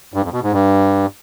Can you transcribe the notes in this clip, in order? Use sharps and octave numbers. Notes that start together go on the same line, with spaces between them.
G2
F2
B2
G#2
G2